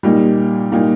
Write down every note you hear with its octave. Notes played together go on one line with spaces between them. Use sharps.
A#2 G3 A#3 D#4
A#2 G3 A#3 D#4